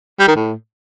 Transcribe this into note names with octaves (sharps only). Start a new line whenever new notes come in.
G3
D#3
A2